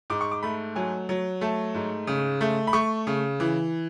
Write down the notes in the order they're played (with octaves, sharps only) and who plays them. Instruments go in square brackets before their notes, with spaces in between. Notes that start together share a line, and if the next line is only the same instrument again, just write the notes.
[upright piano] G#2 D6
C#6
D6
A3 B5
F#3 G#5
F#3
A3 A5
G#2
C#3
A3
B5
A3 C#6
C#3
E3